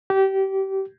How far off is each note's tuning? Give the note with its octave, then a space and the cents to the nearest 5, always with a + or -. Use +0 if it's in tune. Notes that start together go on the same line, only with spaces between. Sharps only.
G4 -25